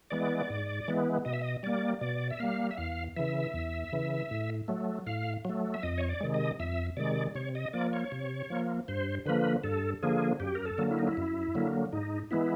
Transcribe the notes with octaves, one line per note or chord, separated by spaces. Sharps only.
E3 G#3 B3 D5
G#2
E3 G#3 B3
B2 D#5
E5
D#5
G3 A#3 D5
B2 D5
E5
G3 A#3 F5
E5
E2 F5
C#3 E3 E5
E2
C#3 E3
A2
F#3 A3
A2 F5
F#3 A3
E5
F2 D#5
C#5
D5
C3 D#3 G#3
D#5
F2 E5
C3 D#3 G#3 D5
C3 C#5
D#5
F3 A#3 D5
C#5
C3
F3 A#3
G2 C5
D3 F3 A#3 B4
G2 A4
D3 F3 A#3 G#4
F#2 G4
A#4
A4
D3 F#3 A#3
E4
D#4
E4
F#2
D3 F#3 A#3
G#2 D#4
E3 G#3 B3 E4